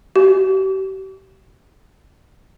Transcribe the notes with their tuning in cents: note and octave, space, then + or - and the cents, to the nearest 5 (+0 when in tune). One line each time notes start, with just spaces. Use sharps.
G4 -40